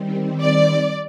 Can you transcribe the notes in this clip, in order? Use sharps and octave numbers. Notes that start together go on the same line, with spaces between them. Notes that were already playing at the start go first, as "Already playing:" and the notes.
Already playing: D#3 G3 C4
D5